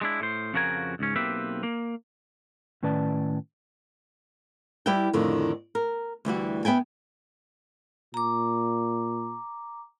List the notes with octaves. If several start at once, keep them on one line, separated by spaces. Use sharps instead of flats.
G#3 D4 E4
A2 C5
F2 C#3 F3 F#4 A#4 G#5
C#2 G#2 C#4
B1 A#3 C4 G4 B4 E5
A#3
A2 D#3 C#4 B4 D5 A5
G3 E4 G4 B4 E5 G5
F2 A2 D3 D#3
A#4
D2 E3 G3 F#4
B3 E5 G5 G#5
A#2 A#5 D6